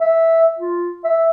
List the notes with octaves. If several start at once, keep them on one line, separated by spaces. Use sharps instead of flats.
E5
F4
E5